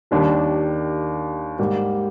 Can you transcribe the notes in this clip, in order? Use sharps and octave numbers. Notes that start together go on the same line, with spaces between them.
D#2 D#3 G3 D4
G#2 G3 A#3